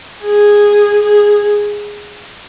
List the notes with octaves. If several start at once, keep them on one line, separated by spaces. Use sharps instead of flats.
G#4
G#4